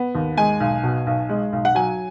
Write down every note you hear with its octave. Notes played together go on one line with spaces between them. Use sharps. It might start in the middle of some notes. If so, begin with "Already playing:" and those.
Already playing: B3
D#2
G#3 G#5
B1
B2
B1
G#3
B1
F#5
F#3 G#5